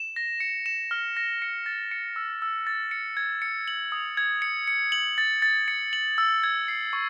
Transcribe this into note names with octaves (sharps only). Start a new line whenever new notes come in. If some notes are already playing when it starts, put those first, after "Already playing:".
Already playing: E7
A#6
C#7
E7
F6
A#6
C#7
A6
C#7
E6
E6
A6
C#7
G#6
C#7
F#7
D#6
G#6
C#7
C#7
F#7
A6
A6
C#7
F#7
E6
G#6
C7
C#6